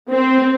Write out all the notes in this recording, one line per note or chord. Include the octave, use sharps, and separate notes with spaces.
C4